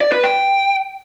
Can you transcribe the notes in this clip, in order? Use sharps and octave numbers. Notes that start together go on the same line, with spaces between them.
D5
B4
G5